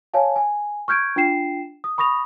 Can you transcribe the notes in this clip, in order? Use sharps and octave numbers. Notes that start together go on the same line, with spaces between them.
C#5 F5 G#5 A5
G#5
C#6 F6 G6 G#6 D7
D4 F4 G5 C7 E7
D#6
B5 C#6 D#6 A#6 F7